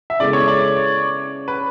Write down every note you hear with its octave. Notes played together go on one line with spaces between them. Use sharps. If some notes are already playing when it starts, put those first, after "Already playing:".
E5
C#3 G#3 B3 E4 A4 D5
C#5
D5
B4